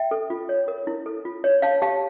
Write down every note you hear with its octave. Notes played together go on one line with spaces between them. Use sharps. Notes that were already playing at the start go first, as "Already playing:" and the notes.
Already playing: E5 G5
A4
F4
C#5
A#4
E4
A4
F4
C#5
C#5 F5 A5
G4 F5 A5